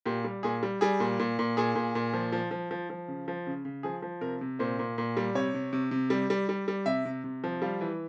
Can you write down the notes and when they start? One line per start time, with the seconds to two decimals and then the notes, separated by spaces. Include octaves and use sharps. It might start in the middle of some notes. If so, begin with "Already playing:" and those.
0.05 A#2 G4
0.24 G3
0.43 A#2 G#4
0.63 G3
0.81 G3 G#4
1.00 A#2
1.19 A#2
1.39 A#2
1.57 A#2 G#4
1.75 A#2
1.95 A#2
2.13 F3
2.32 F3
2.51 F3
2.71 F3
2.90 F3
3.08 C#3
3.28 F3
3.47 C#3
3.65 C#3
3.83 F3 G#4
4.02 F3
4.21 C3 A#4
4.41 C3
4.59 A#2 C5
4.79 A#2
4.98 A#2
5.17 G3
5.35 C3 C#5
5.54 C3
5.73 C3
5.91 C3
6.10 G3
6.30 G3
6.49 G3
6.68 G3
6.86 C3 E5
7.05 C3
7.24 C3
7.44 F3
7.62 G3 F5
7.81 E3